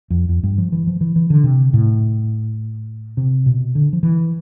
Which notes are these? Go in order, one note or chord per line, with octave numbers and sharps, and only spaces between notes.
F2
F2
G2
F3
E3
F3
E3
E3
D3
C3
A2
C3
B2
D3
F3
E3